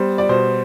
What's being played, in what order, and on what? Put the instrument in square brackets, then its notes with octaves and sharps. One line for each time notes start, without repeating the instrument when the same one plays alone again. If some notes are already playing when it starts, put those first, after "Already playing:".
Already playing: [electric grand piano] G3 B3 [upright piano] C5
[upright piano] D5
[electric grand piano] B2 [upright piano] C5